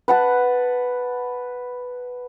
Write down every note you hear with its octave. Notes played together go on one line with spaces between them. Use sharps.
B4 F#5 A5